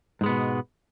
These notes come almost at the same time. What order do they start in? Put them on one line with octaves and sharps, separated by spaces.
G#2 G#3 B3 B2